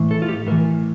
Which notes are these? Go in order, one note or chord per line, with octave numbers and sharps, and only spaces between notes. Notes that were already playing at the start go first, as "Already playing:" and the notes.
Already playing: A2 E3
A4
F4
G4
A2 E3 A#4